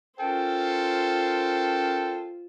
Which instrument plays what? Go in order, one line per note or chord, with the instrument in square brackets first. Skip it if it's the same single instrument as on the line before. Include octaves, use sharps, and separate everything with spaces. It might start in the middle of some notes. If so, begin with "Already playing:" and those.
[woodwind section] C#4 A#4 G5 [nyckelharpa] F4 C5 [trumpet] A4